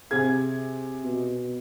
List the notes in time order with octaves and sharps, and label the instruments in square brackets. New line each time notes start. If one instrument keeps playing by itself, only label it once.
[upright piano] C3 G#4 G#6
[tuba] B2